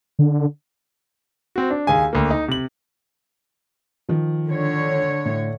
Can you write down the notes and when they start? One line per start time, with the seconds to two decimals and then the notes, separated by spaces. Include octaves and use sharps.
0.19 D3
1.56 C4 F#4
1.70 D4
1.87 D#2 G#4 G#5
2.13 D2 A#3
2.31 D#4
2.48 C3 F#7
4.09 D#3 F3
4.48 D3 C#5
5.25 A2